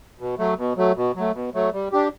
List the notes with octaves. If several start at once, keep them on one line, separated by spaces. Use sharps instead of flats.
B2
F#3 A3
B2
F#3 A3
B2
F#3 A3
B2
F#3 A3
G3
D4 G4